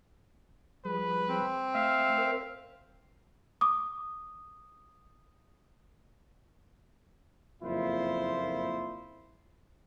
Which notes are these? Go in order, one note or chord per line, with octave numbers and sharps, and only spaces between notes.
F3 G3 G#4 B4
C4
A3 E5 F5
A#4 C5
D6 D#6
F#1 F2 A#2 E4 F4 C5